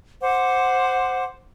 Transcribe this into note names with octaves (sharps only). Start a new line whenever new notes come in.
C5 F#5 D6